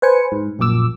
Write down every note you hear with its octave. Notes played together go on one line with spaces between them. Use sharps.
B4 C5 G#5 C#7
G#2
A#1 F#2 A#2 D6 E6